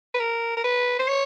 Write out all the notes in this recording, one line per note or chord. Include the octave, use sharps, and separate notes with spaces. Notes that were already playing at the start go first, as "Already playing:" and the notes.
B4
A#4
A#4
B4
C5
C#5